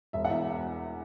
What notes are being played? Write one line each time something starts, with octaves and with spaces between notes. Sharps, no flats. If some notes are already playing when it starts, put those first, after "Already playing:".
E1 E5
F#5
E2 E5